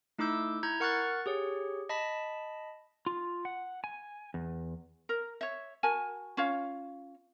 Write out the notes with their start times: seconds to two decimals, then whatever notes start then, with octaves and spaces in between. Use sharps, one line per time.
0.18 A3 D#4 E4 D6 E6 G6
0.63 E4 A#5 G6 G#6
0.80 A#4 F#5 C#6 F6 F#6 A6
1.26 G4 G#4 C#5
1.89 D#5 A5 B5 B6
3.06 F4
3.45 F#5
3.84 G#5
4.34 E2
5.09 A#4
5.41 C#5 E5
5.83 F#4 A#4 G#5 A5
6.37 C#4 F4 C#5 F5